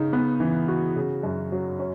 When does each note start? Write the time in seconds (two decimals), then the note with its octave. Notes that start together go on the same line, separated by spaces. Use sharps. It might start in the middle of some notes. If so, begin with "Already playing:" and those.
Already playing: C#3 D#4
0.13 B3
0.40 E3
0.68 F#4
0.96 C#3
1.23 F#2
1.52 F#3
1.79 C#4